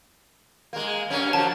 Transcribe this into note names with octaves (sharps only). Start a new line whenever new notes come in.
G#3 A#3
F#2 A#3 C#4
F3 F#3 A#3 A5